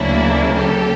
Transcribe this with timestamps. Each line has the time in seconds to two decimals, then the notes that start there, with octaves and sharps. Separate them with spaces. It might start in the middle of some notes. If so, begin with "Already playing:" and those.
Already playing: D2 C#3 F#3 A#3 D4 E4
0.54 G4 A4